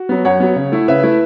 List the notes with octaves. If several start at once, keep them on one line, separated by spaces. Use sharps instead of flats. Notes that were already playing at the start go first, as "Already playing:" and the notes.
Already playing: F#4
F#3 B3
F#2 C#5 F#5
F#3 B3
C#3
A3 E4
C#3 B4 E5
A3 E4